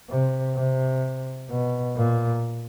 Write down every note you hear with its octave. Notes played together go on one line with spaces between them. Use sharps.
C3
C3
B2
A#2